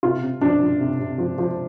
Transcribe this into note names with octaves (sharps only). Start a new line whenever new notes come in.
C3 F4
C3
F3 D4
F3
C3
C3
F3
F3